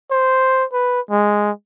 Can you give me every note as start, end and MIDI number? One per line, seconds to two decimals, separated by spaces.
0.11 0.65 72
0.73 1.01 71
1.10 1.51 56